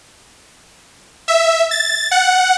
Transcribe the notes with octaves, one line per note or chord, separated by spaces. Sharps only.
E5
A6
F#5